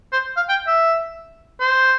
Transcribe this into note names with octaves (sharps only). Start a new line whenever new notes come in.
C5
F5
G5
E5
C5